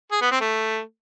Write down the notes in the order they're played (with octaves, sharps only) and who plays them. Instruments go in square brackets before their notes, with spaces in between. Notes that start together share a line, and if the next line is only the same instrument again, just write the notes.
[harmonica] G#4
B3
C4
A3